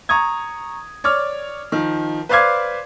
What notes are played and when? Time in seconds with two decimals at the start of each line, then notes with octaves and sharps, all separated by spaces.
0.09 A#5 C#6 D#6 G#6
1.04 C#5 D5 D6 F6
1.72 D#3 F3
2.29 B4 C5 D5 F5 D6 G#6